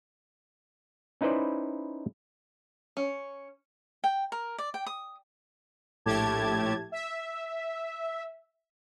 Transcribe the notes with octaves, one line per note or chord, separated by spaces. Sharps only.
C#4 D#4 E4 B4 C5 D5
C#4
G5
A#4
D5
G5
D#6
A#1 A2 A3 G4 A5 G#6
E5